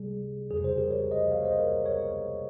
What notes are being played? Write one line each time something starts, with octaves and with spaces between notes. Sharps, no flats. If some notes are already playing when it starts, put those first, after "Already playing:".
Already playing: C3 G3 G#4
F2 C#3 G3 G#4
G#4 C5
G4 A#4
A#4 C#5
C5 D#5
C#5 F5
C5 D#5
A#4 C#5
A#4 C#5